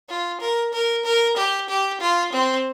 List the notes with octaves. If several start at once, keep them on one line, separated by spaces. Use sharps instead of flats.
F4
A#4
A#4
A#4
G4
G4
F4
C4